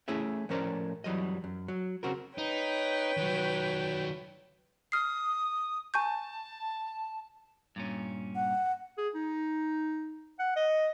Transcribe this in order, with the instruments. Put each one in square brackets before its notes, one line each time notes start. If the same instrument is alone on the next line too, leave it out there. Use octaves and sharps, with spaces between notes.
[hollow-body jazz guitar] A3 C#4 E4 G#4 E5
A2 F3 C#4 A#4 C5 D5
F#2 E3 F#3 G3 D#5
F#2
F#3
C#3 C4 F#4 A#4
[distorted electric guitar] D#4 [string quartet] B4 C#5 G5
[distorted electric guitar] D#3 F#3
[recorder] D#6 [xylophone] F6 C7
[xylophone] G#5 C#6 G6 [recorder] A5
[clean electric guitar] G2 A#2 C#4
[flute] F#5
[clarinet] G#4
D#4
F#5
D#5